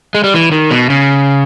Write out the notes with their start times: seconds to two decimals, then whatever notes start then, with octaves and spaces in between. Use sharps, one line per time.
0.15 G#3
0.24 G3
0.34 E3
0.52 D#3
0.71 B2
0.90 C#3